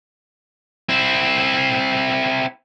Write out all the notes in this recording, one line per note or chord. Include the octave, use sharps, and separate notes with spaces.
C4 E4